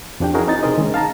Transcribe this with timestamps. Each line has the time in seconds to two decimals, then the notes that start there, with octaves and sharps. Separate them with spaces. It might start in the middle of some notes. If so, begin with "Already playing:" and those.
0.20 F2 F3 D4 G4 G5
0.34 C#4 D#4 E4 F#4 G#4 A#4
0.47 C4 D#4 A6
0.63 C3 C4 G#4 A#4 C5 D#5
0.78 D#3 G#3 C#4
0.94 F5 A5 A#5